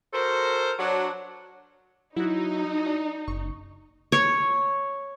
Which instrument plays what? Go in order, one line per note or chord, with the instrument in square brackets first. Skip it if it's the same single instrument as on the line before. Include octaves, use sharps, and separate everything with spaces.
[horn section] F#4 A4 A#4 C5
F#3 D4
[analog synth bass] F#3 [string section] D#4 [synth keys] E4 F#4
[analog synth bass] D4
[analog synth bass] F#1 [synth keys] C#6
[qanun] C#5